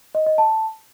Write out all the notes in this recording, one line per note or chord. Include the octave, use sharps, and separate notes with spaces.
D#5
D#5
A5